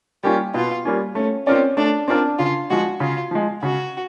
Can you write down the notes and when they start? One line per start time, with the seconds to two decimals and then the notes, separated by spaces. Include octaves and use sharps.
0.23 G3 A#3 C#4 F4 G4
0.54 B2 F4
0.85 G3 A#3 C#4 F4
1.15 A3 C#4
1.47 C4 C#4 F4 A#4 D5
1.77 A3 D4
2.08 C4 D4 F4 A#4 D5
2.38 C#3 F4
2.70 F3 G#3 F#4
3.00 C#3 F4
3.31 F3 G#3
3.62 C#3 F#4